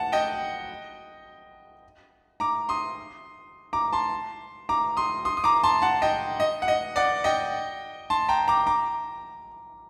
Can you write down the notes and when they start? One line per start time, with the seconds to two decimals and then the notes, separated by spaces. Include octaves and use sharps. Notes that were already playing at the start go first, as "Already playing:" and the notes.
Already playing: F#5 A5
0.12 D#5 G5
2.40 A#5 D6
2.69 C6 D#6
3.73 A#5 D6
3.93 A5 C6
4.69 A#5 D6
4.97 C6 D#6
5.25 C6 D#6
5.37 D#6
5.44 A#5 D6
5.64 A5 C6
5.82 F#5 A5
6.02 D#5 G5
6.40 D#5
6.62 F#5
6.68 D#5
6.96 D5 F#5
7.24 D#5 G5
8.10 A5 C6
8.29 G5 A#5
8.48 A#5 D6
8.67 A#5 D6